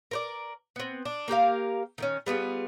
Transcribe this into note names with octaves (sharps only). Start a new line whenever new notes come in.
A#4 C5 D5
B3 C4
D4
A#3 G4 A#4 F5
D#3 A#3 C#4
G3 B3 F4 G#4